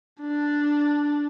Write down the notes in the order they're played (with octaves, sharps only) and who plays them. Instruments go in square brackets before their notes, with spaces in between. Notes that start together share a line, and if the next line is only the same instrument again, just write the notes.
[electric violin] D4